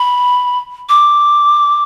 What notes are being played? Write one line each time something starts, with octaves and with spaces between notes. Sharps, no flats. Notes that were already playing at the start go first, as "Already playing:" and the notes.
Already playing: B5
D6